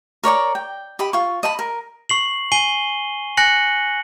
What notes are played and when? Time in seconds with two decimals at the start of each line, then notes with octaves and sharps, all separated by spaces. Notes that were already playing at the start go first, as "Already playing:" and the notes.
0.24 A#4 C#5 D5 A#5
0.55 G5
0.99 G4 D#5 B5
1.13 F4 C#6
1.43 D#5 A5 B5
1.59 A#4
2.10 C#6 C7 F#7
2.52 G#5 C7 D#7 G7
3.37 G#5 F#6 A#6 C#7 F#7